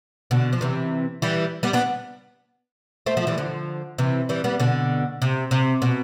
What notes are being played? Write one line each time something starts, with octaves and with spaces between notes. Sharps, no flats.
B2 D3
F3
C3 E3
E3 G3
G3 B3
B3 D4
A3 C4
F3 A3
E3 G3
D3 F3
C3 E3
E3 G3
G3 B3
B2 D3
C3
C3
B2